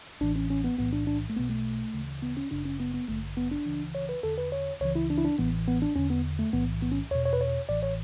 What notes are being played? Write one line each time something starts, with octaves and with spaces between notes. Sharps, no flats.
A1 A2 E3 D4
C#4
C#4
B3
B1 A2 E3 B3
D4
D4
A3
B1 B2 B3
A3
D2 C#3 E3
B3
C#4
G1 F#2 C#3 D4
C#4
B3
B3
A1 G2 D3 A3
B3
D4
C#2 C#3 E3
C#5
B4
E2 D3 A4
B4
C#5
C#2 C#3 E3 C#5
E4
D4
E4
D4
A1 A2 E3 B3
B3
D4
E2 D3 C#4
B3
A3
B1 A2 E3 B3
B3
C#4
E2 B2 C#5
C#5
B4
C#5
A1 A2 E3 D5
C#5